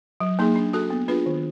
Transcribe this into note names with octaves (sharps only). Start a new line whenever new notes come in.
F#3
A#3 D#4 G#4
D4
F#4 A4
B3
D4 F4 G#4 B4
D#3